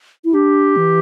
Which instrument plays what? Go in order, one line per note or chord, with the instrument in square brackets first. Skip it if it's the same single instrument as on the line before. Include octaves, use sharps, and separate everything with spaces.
[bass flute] E4
[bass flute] D4 [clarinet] G4
[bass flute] E3